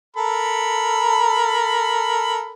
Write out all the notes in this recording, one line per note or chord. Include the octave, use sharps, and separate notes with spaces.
A4 A#4 B5